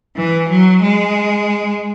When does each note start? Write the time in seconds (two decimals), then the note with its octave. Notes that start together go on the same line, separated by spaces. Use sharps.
0.16 E3
0.49 F#3
0.82 G#3